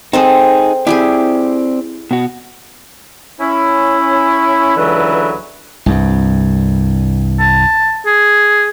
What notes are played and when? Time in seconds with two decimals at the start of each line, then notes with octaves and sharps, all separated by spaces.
0.13 C4 D#4 G#4 A4 C5
0.87 C4 E4 G4 G#4 D5
2.11 B2 F#4
3.41 C#4 E4
4.77 C#2 D3 E3 F#3 A4 B4
5.86 C2 G2
7.40 A5
8.06 G#4